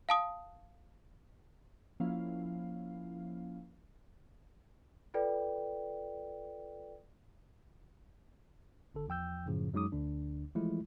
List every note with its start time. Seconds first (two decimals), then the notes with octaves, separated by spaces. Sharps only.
0.09 F5 A5 D#6
2.00 F3 A#3 C#4 E4 F5
5.14 F4 A4 B4 D5 G5
8.94 G#1 D3 A4
9.08 E2 F3 G5 E6 G6
9.46 F#2 A2 C#3 F3
9.73 F#2 F#3 G#3 D#4 D6 D#6
9.92 D2 D3 D4
10.55 E3 F3 G#3 A3 E4 F4